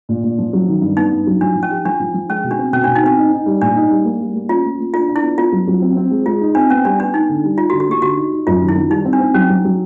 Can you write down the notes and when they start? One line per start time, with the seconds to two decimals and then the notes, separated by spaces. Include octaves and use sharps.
0.09 A#2
0.23 A#2
0.38 F3
0.53 F#3
0.68 D#3
0.81 G2
0.97 B3 D#4
1.11 G2
1.27 F#3
1.41 F3 D4
1.55 F3
1.63 C#4
1.71 G4
1.85 F3 D4
2.00 F3
2.14 F3
2.29 G#3 C#4
2.44 B2
2.51 D4
2.59 C4
2.73 B2 C#4
2.84 D4
2.87 B2
2.95 D#4
3.03 C4 D4
3.18 D#4
3.32 D#4
3.46 G3
3.62 A#2 D4
3.76 D#4
3.91 G3
4.05 A#3
4.20 G3
4.34 A#3
4.49 C#4 F4
4.65 A#3
4.79 A#3
4.94 D4 F4
5.08 D4
5.16 E4
5.23 B3
5.37 B3 F4
5.52 F#3
5.67 F#3
5.82 C4
5.97 C4
6.11 G#3
6.26 G#3 F4
6.41 D#4
6.55 C4 D4
6.70 B3 C#4
6.85 G3 D4
6.99 B3 D4
7.14 B3 D#4
7.29 D3
7.44 G3
7.58 D#4 F4
7.70 F#4
7.73 D3
7.80 F#4
7.88 A#3 G4
8.02 D3 F#4
8.17 D#4
8.32 D#4
8.47 F#2 F4
8.61 D#3
8.69 E4
8.76 D#3
8.90 G3 D#4
9.05 C4
9.13 D4
9.21 C4
9.34 F#3 C#4
9.50 F#3
9.65 F#3